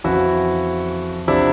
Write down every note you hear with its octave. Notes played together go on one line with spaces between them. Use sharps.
F2 C#3 E3 E4 F#4
E2 C3 F3 D4 E4